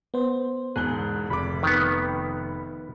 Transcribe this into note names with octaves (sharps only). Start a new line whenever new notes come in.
B3 C5
E1 G#2 G#4 F#6 G7
F1 B5 D6
D#3 B3